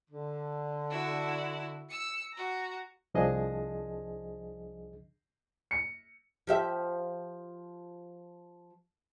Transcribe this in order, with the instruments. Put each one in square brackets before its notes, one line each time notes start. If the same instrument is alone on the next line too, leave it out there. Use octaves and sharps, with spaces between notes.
[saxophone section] D3
[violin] E4 F#4
E6 C#7
F#4 A#5
[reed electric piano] C2 F3 D4 G#4 D#5
[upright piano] C#7
[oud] F3 G4 E5